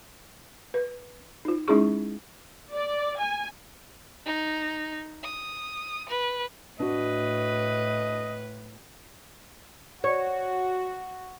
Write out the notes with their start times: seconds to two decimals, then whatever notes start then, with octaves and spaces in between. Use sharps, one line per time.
0.74 B4
1.45 D#4 F4
1.68 G#3 C#4 D#4 E4 G#4 C#6
2.74 D5
3.20 G#5
4.26 D#4
5.24 D#6
6.09 B4
6.80 A2 D4 F#4 B4 D#5
10.04 F#4 C#5